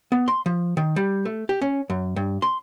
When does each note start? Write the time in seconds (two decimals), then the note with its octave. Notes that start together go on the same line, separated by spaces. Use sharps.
0.12 B3
0.28 C6
0.46 F3
0.77 D#3
0.96 G3
1.25 A3
1.49 G4
1.62 C#4
1.90 F#2
2.16 G2
2.42 C6